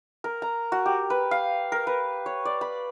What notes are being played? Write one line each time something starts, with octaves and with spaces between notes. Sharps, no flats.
A#4
A#5
F#4
G4
B4
F5
A#4
B4
C#5
D5
B5